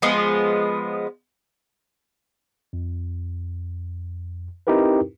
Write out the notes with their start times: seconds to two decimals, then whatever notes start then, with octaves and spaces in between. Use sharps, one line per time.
0.02 F3 G#3 B3
2.73 F2
4.67 C4 D#4 E4 G4 A#4 B4